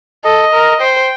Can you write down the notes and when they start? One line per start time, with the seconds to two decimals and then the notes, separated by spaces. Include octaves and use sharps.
0.24 A4 D#5
0.53 A#4
0.80 C5 G5